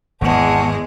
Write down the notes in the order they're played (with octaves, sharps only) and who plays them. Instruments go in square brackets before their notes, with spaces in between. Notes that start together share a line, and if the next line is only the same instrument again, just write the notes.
[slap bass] G#1 [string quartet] E2 G#3 [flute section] F#5 A5 C#6